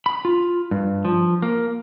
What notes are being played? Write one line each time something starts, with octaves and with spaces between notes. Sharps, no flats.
B5
F4
G2
F3
A#3